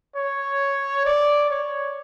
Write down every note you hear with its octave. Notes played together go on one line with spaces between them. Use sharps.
C#5
D5
C#5